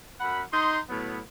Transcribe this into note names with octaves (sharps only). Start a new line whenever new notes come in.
F#2 F#5 B5
D#4 C6
A2 F#3 B3